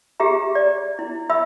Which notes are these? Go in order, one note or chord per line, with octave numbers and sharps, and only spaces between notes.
G4 G#4 E5 A#5
D5
E4
E5 B5 E6